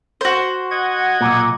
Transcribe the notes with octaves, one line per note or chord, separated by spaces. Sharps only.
F#4 C5
D#5 F#5 G#6
B1 A#2